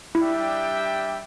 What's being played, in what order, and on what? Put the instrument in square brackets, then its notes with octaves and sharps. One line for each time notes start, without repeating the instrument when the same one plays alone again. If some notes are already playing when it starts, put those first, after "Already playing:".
[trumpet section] G3 D4 G4 E5 G5 [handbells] E4